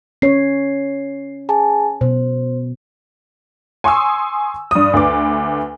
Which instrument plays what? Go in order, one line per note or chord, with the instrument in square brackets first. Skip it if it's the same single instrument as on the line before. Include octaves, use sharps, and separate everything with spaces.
[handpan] C#4 C#5 [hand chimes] C7
[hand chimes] G#4 G#5 A5
[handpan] B2 [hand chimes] C5
[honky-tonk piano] G#5 C6 C#6 D#6 E6
G2 D#6
D2 B4 D6